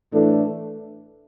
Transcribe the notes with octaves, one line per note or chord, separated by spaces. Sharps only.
A2 E3 A3 D4 A4